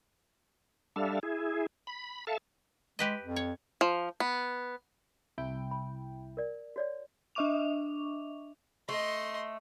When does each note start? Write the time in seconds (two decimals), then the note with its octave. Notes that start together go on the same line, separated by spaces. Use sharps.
0.96 G3 D4 A4 E5 F5
1.23 E4 G#4
1.87 B5
2.27 A4 E5 F5 A5
2.99 G#3 G4 B4 D#5
3.21 F2
3.36 C#5
3.81 F3
4.20 B3
5.38 C2 E4 G5
5.71 B5
6.37 A#4 D5
6.76 F#4 C#5 D5
7.35 D4 D#5 E5 C#6 D6 F7
8.89 A3 D#5 C6